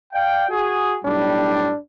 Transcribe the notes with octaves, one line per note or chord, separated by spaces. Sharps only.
D5 F5 G5
F#4 G#4
B1 A2 G3 D4